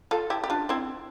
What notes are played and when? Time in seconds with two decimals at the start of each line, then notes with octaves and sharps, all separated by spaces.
0.11 F4 A4
0.30 E4 G4
0.44 G4
0.50 D4 F4
0.69 C4 E4